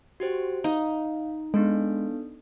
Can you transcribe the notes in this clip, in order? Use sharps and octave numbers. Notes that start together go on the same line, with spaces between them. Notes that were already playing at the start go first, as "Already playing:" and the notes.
F#4 G4 C5
D#4 F5
G#3 B3 D4 A4